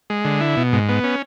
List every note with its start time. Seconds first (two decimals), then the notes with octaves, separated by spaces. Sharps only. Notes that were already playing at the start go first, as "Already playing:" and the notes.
0.10 G#3
0.25 D3
0.40 E4
0.57 B2
0.73 G#2
0.89 B3
1.04 C#4